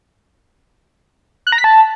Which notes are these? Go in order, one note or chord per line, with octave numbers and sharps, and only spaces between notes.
F#6
A#5
B6
A5